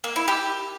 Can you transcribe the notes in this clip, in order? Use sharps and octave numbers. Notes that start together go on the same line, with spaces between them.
A#3
E4
G4